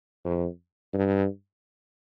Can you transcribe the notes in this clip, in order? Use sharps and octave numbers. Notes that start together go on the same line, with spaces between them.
F2
G2